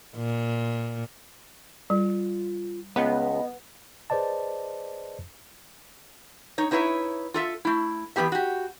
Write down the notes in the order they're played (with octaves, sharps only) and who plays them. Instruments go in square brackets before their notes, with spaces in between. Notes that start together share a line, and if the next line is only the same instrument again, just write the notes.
[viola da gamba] A#2
[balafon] G3 [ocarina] F4
[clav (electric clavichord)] C#2 [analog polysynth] B3 [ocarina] D#5
[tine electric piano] G#4 B4 C5 D5 D#5 A5
[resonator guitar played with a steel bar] D#4 C#5
D#4 E4 B4 C#5 E5
F4 A4 E5
A3 E4
E3 G#3 B3 G4 E5
F#4 G4